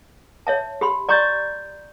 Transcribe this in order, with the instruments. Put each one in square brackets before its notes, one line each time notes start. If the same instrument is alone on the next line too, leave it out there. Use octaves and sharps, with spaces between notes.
[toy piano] C#5 E5 A5
G4 B5 C6
[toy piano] D5 A#5 C6 [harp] C#6 G6 A6